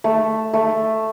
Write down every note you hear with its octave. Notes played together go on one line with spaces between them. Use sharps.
A3
A3